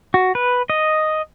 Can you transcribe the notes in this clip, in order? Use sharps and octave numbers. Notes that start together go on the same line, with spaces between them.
F#4
B4
D#5